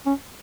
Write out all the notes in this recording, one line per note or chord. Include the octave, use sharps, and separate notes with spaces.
C#4